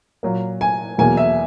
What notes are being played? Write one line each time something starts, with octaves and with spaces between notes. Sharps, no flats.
A#2 F#3 A#3
G#5
E2 B2 F#3 A#3 G#5
E5